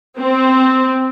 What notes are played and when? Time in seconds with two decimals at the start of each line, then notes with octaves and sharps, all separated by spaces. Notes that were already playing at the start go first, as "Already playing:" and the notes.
0.19 C4